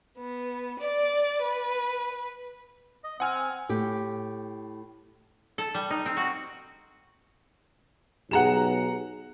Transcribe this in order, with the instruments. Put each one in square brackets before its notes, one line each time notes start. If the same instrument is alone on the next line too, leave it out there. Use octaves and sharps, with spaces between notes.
[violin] B3
D5
B4
[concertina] D#5
[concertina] C4 [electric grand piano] F#5 G#5 F6
[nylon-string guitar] A2 G4
[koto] A4
G3
D#4
C4
F#4
[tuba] B1 [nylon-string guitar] G4 G#4 [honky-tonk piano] F#5 A#5 E7